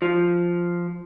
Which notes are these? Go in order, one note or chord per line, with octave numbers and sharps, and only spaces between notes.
F3